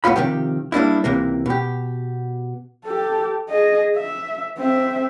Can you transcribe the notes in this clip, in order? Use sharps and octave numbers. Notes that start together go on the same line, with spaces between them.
C2 A2 B3 F4 B5
C3 D#3 F3 G4
G3 A#3 D4 E4
C#2 C3 E3 A#3
B2 G4
G4 A4
G#4 D#5
E5
C4 E5